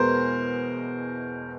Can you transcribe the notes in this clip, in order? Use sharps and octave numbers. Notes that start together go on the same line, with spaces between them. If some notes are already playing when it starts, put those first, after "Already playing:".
Already playing: E2 B2 G#3 A#4 C5